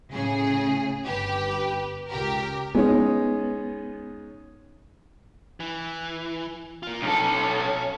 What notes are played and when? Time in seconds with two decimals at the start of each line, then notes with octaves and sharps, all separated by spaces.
0.12 A2 C#3 G#4
1.05 G1 G4 B4
2.09 C#2 G4 A#4
2.75 G#3 B3 C#4 D#4
5.60 E3
6.83 A#3 F4
7.03 B1 C#4 A4